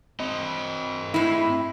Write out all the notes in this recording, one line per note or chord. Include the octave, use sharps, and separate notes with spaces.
C4 D#5
A2 E4